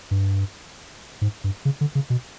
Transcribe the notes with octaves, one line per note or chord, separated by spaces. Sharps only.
G2
G#2
G2
C#3
D3
C#3
B2